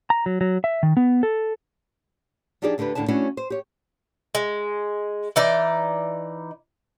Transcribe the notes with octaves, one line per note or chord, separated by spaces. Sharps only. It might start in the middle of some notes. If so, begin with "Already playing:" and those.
A#5
F#3
F#3
E5
D#3
B3
A4
F3 D4 D#4 G4 G#4 D5
D2 D3 D4 G4 B4
D#2 A2 D3 D4 E4 A5
A3 C#4 D4 E4 F#4 C#5
C5
G4 C#5
G#3
E3 D#4 D5